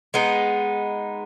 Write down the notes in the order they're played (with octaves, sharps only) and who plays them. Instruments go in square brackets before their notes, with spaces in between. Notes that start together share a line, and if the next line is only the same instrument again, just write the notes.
[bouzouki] G#3 B3 D#4